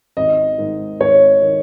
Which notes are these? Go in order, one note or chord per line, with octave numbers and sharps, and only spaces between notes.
G#1 D#5
G#2 D#3
G#1 C#5
D#3